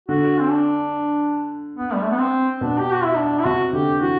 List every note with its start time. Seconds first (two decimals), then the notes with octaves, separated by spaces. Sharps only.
0.09 D3 F#4
0.40 C4
0.51 D4
1.77 B3
1.94 G3
2.03 A3
2.11 B3
2.19 C4
2.61 B2 D4
2.78 G4
2.91 F#4
3.05 E4
3.17 D4
3.39 E4
3.45 C3 F#4
3.73 D3 G4
4.01 E3 F#4